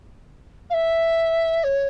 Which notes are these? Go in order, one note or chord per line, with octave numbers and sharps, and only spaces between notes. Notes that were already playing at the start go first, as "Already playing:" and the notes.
F5
E5
C#5